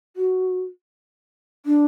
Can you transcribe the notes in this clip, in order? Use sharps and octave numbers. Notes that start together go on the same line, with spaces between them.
F#4
D4